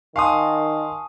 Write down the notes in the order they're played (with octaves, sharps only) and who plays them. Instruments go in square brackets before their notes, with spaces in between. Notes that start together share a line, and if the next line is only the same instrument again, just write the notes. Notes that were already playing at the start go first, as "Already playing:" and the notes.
[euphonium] D#3 [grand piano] F5 C6 D#6 [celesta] G#5 A5 C#6